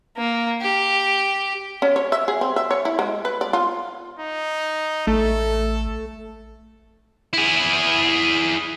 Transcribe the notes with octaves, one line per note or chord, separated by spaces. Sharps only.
A#3
G4
C#4
C#5
E5
G#4
C4
E5
C#5
E4
G#3
B4
D5
F4
D#4
A1 A3 A4
E4 G#4